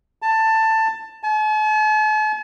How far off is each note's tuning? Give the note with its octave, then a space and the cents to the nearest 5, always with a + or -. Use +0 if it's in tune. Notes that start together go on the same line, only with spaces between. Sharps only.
A5 +15
A5 -45